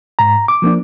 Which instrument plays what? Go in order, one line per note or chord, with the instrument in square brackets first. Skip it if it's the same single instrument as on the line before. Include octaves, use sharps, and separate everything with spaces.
[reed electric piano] G#2 A#5
D6
F3 A#3 D4